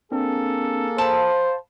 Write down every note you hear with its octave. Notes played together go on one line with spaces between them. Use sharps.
A#3 C4 D4 G#4 A4
C5 F5 A5 B5